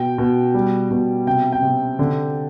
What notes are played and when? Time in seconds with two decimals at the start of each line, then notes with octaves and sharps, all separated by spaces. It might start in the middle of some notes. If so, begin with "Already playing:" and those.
Already playing: B2 G5
0.18 B2
0.54 G3
0.91 B2
1.27 C3 G5
1.52 G5
1.62 C3
1.99 D3